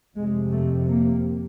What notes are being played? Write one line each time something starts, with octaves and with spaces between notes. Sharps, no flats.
F2 C3 G#3
A3
A#3